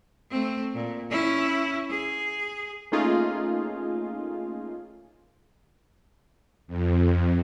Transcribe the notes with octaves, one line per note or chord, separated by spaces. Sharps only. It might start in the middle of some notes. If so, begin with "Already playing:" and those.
A3 C4
A#2
C#4 E4
G#4
A3 A#3 C#4 D#4 F4 G#4
F2